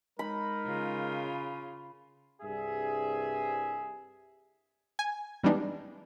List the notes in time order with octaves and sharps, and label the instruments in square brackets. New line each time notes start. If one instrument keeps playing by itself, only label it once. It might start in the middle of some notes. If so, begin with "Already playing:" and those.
[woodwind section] G#3 D#4 [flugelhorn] A#4 [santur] B5
[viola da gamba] C#3 F4
[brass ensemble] C2 G2 G#4 E5
[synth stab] G#5
E3 G3 G#3 B3 D4 D#4